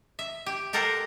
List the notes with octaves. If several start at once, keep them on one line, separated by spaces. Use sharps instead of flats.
E5
G4
G4 A4 A#4 C5 F#5